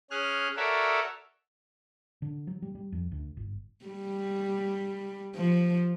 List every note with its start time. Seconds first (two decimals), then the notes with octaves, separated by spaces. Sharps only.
0.11 C#4 G#4 F6 F#6
0.57 F#4 A4 A#4 C#5 D5 E5
2.22 D3
2.47 F#3
2.62 G3
2.75 G3
2.92 F2
3.12 D2
3.37 G1
3.86 G3
5.36 F3